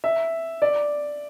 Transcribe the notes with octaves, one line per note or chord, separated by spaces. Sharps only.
E5
D5